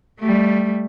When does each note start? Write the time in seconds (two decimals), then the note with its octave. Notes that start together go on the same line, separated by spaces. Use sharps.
0.19 G3 A3